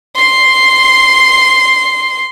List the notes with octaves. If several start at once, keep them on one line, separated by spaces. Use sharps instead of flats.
C6 C7